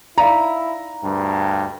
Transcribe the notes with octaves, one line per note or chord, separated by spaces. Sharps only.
D#4 E4 D5 F5 A#5
D2 G2